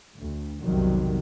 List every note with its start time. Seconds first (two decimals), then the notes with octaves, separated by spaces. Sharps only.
0.17 D2
0.62 B1 F2 C3 D#3 F#3 G3